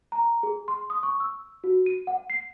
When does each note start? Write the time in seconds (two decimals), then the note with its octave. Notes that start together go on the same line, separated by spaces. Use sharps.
0.12 A#5
0.43 G#4
0.68 C6
0.90 D#6
1.03 C#6
1.20 E6
1.64 F#4
1.86 D#7
2.07 F#5
2.30 C7